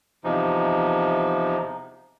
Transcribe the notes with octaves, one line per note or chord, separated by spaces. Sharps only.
E2 C3 F3 D#4